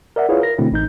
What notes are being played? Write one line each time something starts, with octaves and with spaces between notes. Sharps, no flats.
A#4 D5 E5 F#5
E4 F4 G#4 B4 C#5 F5
A#4 A#6
B2 D3 A3 C4 E4
A1 D#4 G6